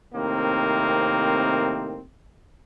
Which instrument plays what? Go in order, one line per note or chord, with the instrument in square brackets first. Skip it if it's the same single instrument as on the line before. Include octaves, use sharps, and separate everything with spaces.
[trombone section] A2 C3 D#3 A#3 C4